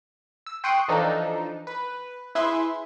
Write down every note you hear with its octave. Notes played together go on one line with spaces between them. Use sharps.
E6
G5 C6 C#6 D#6 F#6 D7
E3 F3 D4 D#4 A4
B4
E4 G#4 B4 E5 C6